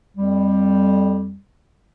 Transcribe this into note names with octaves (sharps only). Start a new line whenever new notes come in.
F2 G3